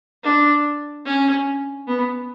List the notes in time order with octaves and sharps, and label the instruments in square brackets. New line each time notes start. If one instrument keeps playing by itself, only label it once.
[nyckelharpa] D4
C#4
B3